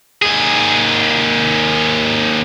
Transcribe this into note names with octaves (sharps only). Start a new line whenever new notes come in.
D#2 G#4